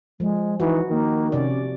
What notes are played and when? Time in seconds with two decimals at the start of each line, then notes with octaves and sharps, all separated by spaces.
0.20 F3 G#3
0.60 E3 D#4 F#4
0.90 D#3 A#3
1.32 C3 C#4 D5